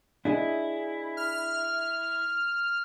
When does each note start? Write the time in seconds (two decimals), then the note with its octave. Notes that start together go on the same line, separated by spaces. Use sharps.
0.25 D4 E4 G#4 D#5
1.17 F6